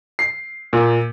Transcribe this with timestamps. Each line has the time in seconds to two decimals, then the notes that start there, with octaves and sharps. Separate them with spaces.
0.19 C7
0.73 A#2